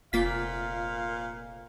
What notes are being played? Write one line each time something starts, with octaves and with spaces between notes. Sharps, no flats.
F1 A#2 A#3 F4 F5 B6